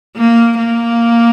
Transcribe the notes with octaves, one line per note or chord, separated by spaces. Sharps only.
A#3
A#3